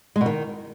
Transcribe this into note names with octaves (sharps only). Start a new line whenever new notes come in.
G#3
B2
D#3